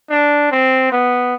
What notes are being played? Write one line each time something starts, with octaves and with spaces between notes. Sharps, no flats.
D4
C4
B3